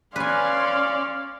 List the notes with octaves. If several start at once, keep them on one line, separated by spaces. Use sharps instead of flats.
C#4 B4 D5 F5 G#5 C6